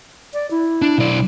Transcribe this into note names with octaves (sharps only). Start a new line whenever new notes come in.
D5
E4
D4
B1 D5